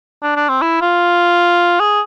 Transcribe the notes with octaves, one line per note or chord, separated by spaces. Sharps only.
D4
D4
C4
E4
F4
G#4